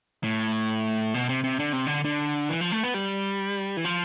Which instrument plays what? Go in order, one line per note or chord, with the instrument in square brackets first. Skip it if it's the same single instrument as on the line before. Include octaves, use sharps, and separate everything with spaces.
[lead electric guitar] A2
B2
C3
C3
D3
C3
D3
D3
E3
F3
A3
B3
G3
E3
F3